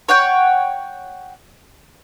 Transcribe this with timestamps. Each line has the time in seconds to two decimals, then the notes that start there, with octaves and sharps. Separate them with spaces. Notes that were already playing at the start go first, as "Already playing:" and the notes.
0.09 C#5 F#5 G5